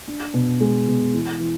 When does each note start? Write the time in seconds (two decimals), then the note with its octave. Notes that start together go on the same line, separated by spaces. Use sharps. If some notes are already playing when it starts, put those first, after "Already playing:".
0.08 D4
0.34 B2
0.61 G#3
0.88 B2
1.13 E3
1.39 E3